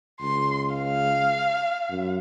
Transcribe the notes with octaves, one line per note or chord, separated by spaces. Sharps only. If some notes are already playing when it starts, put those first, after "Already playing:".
C#2 C6
F5
F#2